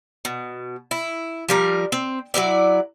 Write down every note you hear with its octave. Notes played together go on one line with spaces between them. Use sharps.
B2
E4
F3 G3 A#4
C4
F#3 G#3 E4 D5